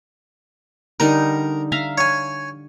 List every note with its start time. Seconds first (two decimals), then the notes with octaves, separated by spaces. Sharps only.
1.00 D3 G3 D#4 A#4
1.72 E5 F5 A#5
1.98 C#5 G#5